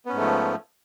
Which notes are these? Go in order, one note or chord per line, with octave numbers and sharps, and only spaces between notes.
G#2 F3 A3 B3 C#4